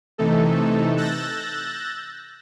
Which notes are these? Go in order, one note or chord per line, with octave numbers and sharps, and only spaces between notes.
C3 E3 A3 D#4 A4
E6 F#6 G6 A6 A#6